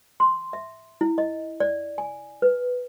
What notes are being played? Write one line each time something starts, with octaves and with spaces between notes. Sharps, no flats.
C6
E5
E4
D#5
D5
G#5
B4